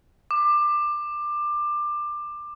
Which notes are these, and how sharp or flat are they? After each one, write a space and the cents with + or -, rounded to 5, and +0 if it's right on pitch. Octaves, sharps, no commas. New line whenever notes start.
D6 +20